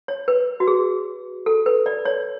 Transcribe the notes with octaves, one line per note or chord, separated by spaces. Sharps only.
C#5
B4
F#4
G#4
A4
B4
D5
C#5